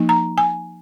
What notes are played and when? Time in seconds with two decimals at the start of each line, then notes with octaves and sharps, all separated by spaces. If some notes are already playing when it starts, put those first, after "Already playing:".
Already playing: F3 A#3 D#4
0.09 A#5
0.38 G#5